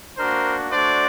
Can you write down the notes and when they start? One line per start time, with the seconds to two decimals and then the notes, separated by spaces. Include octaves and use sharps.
0.18 A#3 D4 F#4 A#4 C5
0.72 A3 D4 F#4 C5 D5